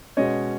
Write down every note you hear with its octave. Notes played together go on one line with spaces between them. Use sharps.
B2 G#3 C#4 C#5 D#5